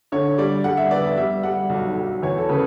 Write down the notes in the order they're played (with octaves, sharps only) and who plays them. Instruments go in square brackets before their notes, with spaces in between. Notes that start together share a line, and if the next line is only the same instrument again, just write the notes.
[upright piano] D3 C#5
G3 D5
G3 F#5
E5
B3 D5
E5
G3 E5
G3 F#5
B1
B1
E2 C#5
A4
C#3 B4